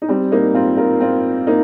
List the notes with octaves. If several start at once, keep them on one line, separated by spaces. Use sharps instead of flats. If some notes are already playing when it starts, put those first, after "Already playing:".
D#4
G3 C4
A#3 D#4
C4 F4
F4 A#4
C4 F4
A#3 D#4